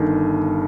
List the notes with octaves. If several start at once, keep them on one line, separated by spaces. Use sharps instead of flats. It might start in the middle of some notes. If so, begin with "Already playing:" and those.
Already playing: G1 G2 D#3